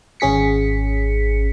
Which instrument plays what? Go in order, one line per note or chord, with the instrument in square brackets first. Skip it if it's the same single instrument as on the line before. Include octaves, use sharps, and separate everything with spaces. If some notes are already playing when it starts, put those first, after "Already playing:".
[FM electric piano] G#1 C#4 G#4 B6 C#7